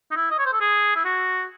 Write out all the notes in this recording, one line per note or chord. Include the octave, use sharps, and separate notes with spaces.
D#4
E4
D#5
C#5
C5
A4
G#4
E4
F#4